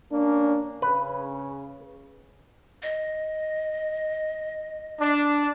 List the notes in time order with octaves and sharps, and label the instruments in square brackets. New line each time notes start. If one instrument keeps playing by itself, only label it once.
[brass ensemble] A#3 C#4 D4
[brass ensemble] C#3 [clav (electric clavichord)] B4
[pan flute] D#5
[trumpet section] D4